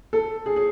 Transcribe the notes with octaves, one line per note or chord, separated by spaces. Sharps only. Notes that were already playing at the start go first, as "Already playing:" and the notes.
A4
G#4
G#4